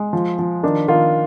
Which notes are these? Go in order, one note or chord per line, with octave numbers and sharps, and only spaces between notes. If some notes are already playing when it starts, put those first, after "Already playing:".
Already playing: G#3
F3
F3
D#3 D4
D#3 F4